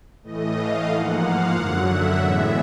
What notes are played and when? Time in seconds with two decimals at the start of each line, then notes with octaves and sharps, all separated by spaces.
0.23 A2 E3 A3 D#5
0.56 F5
0.88 G#2 F3 A#3 F#5
1.21 F5
1.52 F#2 D3 F#3 F#5
1.86 E5
2.17 A2 E3 G#3 B3